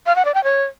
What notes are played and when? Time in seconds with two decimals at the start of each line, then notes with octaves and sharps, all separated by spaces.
0.06 F5
0.16 F#5
0.25 D5
0.34 G5
0.44 C#5